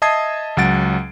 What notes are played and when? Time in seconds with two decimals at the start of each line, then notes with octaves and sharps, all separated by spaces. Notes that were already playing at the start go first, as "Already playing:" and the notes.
0.02 D#5 E5 A5 D#6 G#6 C7
0.57 C#2 F#3 F#5 A6 D7